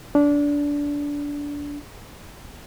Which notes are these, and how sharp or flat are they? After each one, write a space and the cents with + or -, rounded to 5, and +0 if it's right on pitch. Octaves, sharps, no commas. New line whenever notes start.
D4 -20